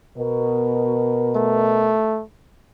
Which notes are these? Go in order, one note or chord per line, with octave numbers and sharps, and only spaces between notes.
B2 A#4
A3